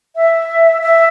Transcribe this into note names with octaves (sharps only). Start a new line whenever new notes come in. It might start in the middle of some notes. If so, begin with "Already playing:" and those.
E5
E5